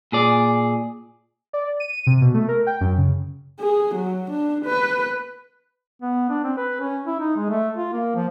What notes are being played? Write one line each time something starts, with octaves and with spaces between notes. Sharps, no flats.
A#2 G#4 D5
D5
D#7
D#7
C3
B2
A3
A#4
G5
F#2
C#3
G#4
F#3
D4
B4
B3
D4
C4
B4
C#4
E4
D#4
G#3
A3
F4
A#3
F3